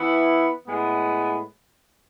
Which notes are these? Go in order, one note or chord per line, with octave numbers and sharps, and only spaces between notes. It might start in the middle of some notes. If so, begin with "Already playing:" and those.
Already playing: E3 B3 E4
A2 G#3 B3